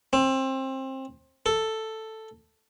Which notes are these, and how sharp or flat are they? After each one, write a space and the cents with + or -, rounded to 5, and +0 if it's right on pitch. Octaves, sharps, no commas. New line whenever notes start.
C4 +25
A4 +5